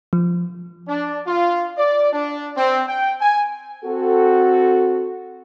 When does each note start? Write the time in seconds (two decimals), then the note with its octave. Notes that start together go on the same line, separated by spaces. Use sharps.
0.13 F3
0.88 D4
1.26 F4
1.78 D5
2.13 D4
2.57 C4
2.88 G5
3.21 G#5
3.84 C4 F#4 A4